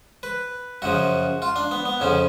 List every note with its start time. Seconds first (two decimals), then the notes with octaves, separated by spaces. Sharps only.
0.23 B4
0.82 F#2 C#3 F3 F#4
1.42 F4
1.56 D4
1.71 B3
1.85 B3
2.00 F2 C#3 F3 C#4